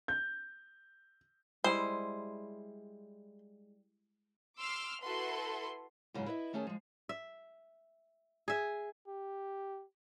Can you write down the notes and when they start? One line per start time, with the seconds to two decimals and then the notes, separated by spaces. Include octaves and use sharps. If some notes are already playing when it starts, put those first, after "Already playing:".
0.08 G6
1.64 G3 G#3 E4 C5
4.58 C6 D6 E6 F6 C7
5.03 E4 F#4 A4 B4 C6
6.14 G#2 C#3 E3 F#3 C#4
6.26 E4 B4 C#5 D#5 E5
6.53 D#3 A3 C#4 G#4 A5
6.67 F3 G#3
7.09 E5
8.48 G#4 E5
9.08 G4